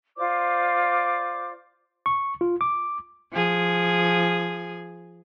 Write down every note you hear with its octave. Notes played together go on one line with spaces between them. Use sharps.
F4 C5 D5 D6
C#6
F4
D6
F3 G#4